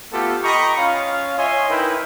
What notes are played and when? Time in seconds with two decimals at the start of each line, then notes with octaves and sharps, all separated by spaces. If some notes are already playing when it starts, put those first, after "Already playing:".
0.12 A3 B3 F4 G4 A4
0.44 D#5 G5 A#5 B5 C#6
0.77 C#4 F4 F5
1.38 C#5 D#5 E5 G#5 C6
1.69 D#4 E4 A#4 B4 G5